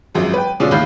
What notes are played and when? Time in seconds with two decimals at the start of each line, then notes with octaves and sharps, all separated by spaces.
0.14 G#1 F#2 F3 F#3 G#3
0.34 B4 G5
0.60 B2 D3 G#3 C#4 D4 F4
0.71 D#2 A2 F5 B5 G6 C7